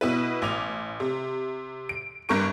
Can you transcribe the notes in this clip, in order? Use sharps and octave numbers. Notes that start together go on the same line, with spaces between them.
B2 E4 B4
A1 D6 F7
C3
D7
F#1 G2 A#4 C#6 D7